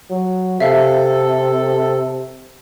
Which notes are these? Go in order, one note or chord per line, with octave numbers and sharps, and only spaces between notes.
F#3
C3 A4 E5 F5